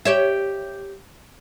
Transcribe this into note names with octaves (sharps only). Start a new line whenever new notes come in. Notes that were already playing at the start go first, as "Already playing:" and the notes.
G4 C#5 E5